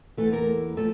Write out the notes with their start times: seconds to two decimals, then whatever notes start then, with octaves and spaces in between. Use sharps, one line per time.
0.17 E2 E3 A3 A4
0.32 A#3 A#4
0.77 F3 A3 A4